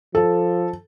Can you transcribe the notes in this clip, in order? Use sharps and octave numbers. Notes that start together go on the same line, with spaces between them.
F3 A4